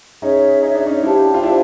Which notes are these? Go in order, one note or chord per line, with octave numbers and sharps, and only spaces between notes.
C#4 D#4 G#4 C#5 E5
D#4
D4
C#4 D#4
D4 E4 G4 C5 F5 A5
F4
D4 E4